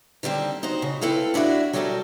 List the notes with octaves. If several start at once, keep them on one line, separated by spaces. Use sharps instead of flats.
D3 D#3 G3 C4
D#4 F#4 C5
C#3
C4 E4 A4 B4 F5
C#4 D4 E4 F#4
F#3 G3 F#4 G4 A4 A#4